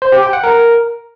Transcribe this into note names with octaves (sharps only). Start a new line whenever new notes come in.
C5
G4
G5
F#5
A#4